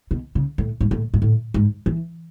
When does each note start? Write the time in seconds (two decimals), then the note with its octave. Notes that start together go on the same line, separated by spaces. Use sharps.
0.11 B2
0.35 C#3
0.58 A2
0.81 G#2
0.91 A2
1.14 G#2
1.22 A2
1.54 G#2
1.86 E3